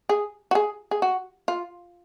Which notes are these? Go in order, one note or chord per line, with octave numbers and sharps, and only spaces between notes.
G#4
F#4
G#4
G#4
F#4
F4